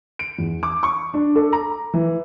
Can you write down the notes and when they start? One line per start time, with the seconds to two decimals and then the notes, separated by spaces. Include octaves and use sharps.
0.19 D7
0.39 E2
0.63 D6
0.83 C#6
1.14 D4
1.36 A4
1.53 A#5
1.94 E3